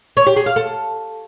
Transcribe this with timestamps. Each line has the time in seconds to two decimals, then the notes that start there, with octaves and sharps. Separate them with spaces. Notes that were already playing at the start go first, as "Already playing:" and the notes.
0.17 C#5
0.27 G4
0.36 G#4
0.46 F5
0.56 A4